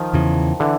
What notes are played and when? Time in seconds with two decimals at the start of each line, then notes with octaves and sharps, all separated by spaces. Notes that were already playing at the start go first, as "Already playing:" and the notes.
Already playing: D#3 F3
0.14 E2 C#3 E3
0.60 D3 E3